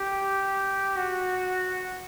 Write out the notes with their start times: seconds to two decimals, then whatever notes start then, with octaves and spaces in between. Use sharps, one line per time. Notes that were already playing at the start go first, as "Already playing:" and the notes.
Already playing: G4
0.97 F#4